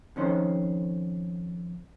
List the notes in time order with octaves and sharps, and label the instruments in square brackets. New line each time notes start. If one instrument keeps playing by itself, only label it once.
[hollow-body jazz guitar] F2 D#3 C#4 C5